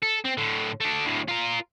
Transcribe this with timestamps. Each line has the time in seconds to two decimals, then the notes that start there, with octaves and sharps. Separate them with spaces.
0.03 A4
0.25 C4
0.38 A2 D3
0.80 A3 D4
1.05 D2 A2
1.28 F4 A#4